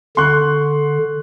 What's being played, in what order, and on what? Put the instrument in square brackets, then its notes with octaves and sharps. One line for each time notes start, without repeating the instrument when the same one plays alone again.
[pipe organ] D3 [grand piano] C6 C#6 F#6